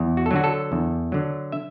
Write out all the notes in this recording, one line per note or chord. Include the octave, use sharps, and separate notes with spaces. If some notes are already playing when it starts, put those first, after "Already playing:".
Already playing: E2
F#4
A4
D3 F#3 F#4
A4
E2
D3 F#3
E5